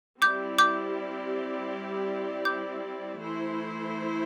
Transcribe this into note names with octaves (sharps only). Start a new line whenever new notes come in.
G3 C4 E4 G4 D5 D6 G6
D6 G6
D6 G6
E3 A3 E4 C5